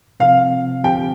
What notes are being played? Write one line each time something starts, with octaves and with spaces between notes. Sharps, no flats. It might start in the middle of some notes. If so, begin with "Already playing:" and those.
C3 F3 C4 F5
D2 D3 F3 C4 G4 G5